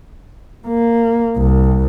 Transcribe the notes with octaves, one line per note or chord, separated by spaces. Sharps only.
A#3
C2